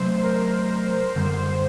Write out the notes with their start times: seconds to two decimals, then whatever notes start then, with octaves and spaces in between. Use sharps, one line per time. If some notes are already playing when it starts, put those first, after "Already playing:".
Already playing: C3 F#3 A3 C5
0.22 A#4
1.16 F#2 D3 G3 C5